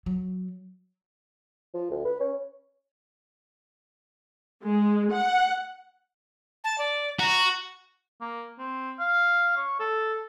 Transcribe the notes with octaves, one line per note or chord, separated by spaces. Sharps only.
F#3
F3
D2
B4
C#4
G#3
F#5
A5
D5
F#4 A#5
A#3
C4
F5
C#5
A4